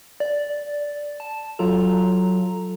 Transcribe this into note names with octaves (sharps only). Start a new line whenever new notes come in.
D5
A5
F#3 F4 A4 A#5